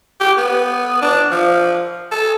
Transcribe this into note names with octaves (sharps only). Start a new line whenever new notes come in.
G4
B3
D4
F3
A4